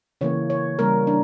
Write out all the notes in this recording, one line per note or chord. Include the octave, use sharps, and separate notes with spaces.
C#3 E3 A#3 C#5
C#5
C#3 G3 A#3 A#4
D4